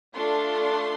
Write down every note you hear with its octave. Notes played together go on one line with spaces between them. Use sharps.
A3 D4 F4 A4 C6